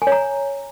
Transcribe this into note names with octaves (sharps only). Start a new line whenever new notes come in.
G#5
C#5
A#5